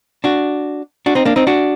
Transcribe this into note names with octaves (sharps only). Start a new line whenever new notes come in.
D4 F#4
D4 F#4
C4 D#4
A#3 D4
C4 D#4
D4 F#4